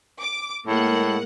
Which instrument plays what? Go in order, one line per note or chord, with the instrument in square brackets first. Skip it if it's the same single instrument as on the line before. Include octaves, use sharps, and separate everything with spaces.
[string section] D6
[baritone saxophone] A2 [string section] G#3 A#3 F#5